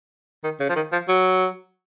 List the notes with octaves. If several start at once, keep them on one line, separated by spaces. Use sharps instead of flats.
D#3
C#3
F3
D#3
F3
F#3